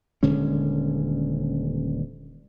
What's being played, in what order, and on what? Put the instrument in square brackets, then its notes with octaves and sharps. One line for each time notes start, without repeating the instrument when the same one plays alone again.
[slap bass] D#1 D3 G#3 C#4